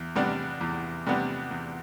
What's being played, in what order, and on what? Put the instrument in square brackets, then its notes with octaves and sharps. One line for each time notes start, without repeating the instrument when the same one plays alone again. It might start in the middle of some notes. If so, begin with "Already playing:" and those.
Already playing: [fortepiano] E2
C3 G3 B3 D4
E2
C3 G3 B3 D4
E2